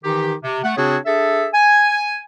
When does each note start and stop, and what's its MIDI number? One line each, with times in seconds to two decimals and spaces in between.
0.03 0.33 51
0.03 0.33 52
0.03 0.33 63
0.03 0.33 67
0.43 0.59 48
0.63 0.76 57
0.63 0.76 78
0.76 0.97 49
0.76 0.97 60
0.76 0.97 62
0.76 0.97 66
0.76 0.97 68
0.76 0.97 73
1.06 1.47 62
1.06 1.47 68
1.06 1.47 69
1.06 1.47 76
1.53 2.19 80